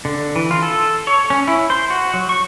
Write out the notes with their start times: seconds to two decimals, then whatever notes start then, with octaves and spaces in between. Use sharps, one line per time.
0.05 D3
0.36 E3
0.51 F4
0.62 A4
1.07 C#5
1.30 C#4
1.48 E4
1.70 C5
1.90 F#4
2.14 F#3
2.29 C#6